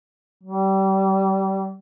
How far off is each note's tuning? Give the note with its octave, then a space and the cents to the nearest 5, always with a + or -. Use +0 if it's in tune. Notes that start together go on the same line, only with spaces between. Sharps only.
G3 -25